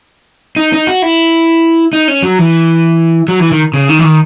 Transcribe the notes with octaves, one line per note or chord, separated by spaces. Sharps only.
D#4
D#4
F#4
E4
D#4
C#4
F#3
E3
F#3
E3
D#3
C#3
D#3
E3
D#3